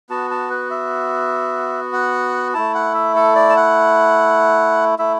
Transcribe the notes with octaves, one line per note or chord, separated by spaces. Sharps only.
B3 F#4 A5
A5
B4
E5
F#5
A3 E4 A5
F#5
E5
A4
D5
A5
F#5
A3 E4 E5